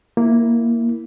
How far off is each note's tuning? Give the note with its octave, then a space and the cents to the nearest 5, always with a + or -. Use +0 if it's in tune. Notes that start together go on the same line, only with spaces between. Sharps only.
A#3 +0 E4 +0